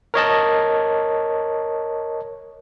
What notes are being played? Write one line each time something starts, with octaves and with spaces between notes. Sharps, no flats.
A#4 C#5 D#5 A5